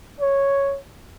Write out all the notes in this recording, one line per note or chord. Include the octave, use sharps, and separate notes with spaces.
C#5